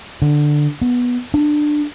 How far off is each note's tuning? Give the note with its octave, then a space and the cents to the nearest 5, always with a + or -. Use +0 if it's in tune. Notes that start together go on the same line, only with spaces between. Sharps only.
D3 +10
B3 -10
D4 +20